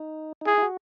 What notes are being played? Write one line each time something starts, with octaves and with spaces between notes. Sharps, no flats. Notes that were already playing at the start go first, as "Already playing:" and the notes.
Already playing: D#4
D#4
E4 G#4
E4
F#4